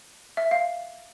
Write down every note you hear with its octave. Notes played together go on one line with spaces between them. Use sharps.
E5
F5